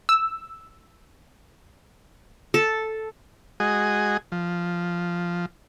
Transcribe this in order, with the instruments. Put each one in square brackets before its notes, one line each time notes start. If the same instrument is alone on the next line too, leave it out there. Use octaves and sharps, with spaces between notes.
[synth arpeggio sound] E6
[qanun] A4
[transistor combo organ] G#3 F#4 G#4 D#5
F3